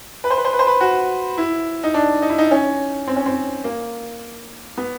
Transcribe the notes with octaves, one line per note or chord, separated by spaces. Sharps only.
B4
C5
B4
C5
B4
C5
B4
F#4
E4
D#4
D4
D#4
E4
D#4
C#4
C4
C#4
C4
A#3
B3